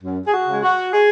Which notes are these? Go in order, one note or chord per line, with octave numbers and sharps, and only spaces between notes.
F#2
G#4
F#4
C#3 G#3
F#4
G#4